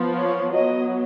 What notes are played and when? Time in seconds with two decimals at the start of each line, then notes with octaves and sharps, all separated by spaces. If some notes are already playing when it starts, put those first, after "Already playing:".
Already playing: F3 B3
0.16 C#5
0.53 F#3 B3 D#5